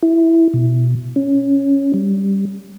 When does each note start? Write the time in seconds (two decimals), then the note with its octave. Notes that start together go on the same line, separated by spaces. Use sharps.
0.03 E4
0.54 B2
1.16 C#4
1.94 G3